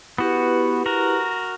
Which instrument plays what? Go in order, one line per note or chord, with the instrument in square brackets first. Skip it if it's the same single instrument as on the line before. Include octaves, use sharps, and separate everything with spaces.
[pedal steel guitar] B3 F#4 [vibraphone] E4 G4 B4
[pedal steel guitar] F#4 A#4